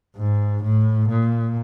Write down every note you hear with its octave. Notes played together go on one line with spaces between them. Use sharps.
G#2
A2
A#2